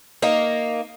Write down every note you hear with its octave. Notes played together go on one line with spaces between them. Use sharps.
A#3 D#4